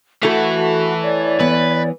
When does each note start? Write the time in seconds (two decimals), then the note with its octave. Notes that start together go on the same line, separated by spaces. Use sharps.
0.23 E3 A3 E4 F#4 A4
1.02 C#5 D5
1.40 E3 B3 B4